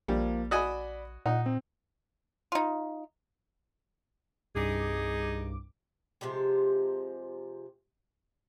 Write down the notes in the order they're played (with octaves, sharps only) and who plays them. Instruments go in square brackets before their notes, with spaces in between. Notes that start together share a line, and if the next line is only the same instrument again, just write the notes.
[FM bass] A#1 [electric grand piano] F3 A#3 [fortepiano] G3
[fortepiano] F#4 D#5 G#5 [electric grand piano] D5 B5
[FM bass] A#2 [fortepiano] D#4 [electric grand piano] F#5
[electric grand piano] C4
[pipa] D#4 F4
[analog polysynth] C2 G2 D6 [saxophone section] D#4 G#4
[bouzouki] C3 F3 G#3 G4